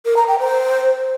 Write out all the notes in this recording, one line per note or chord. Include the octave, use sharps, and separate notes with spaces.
A#4
A#5
G5
C5